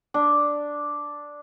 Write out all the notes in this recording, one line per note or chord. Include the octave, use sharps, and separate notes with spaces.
D4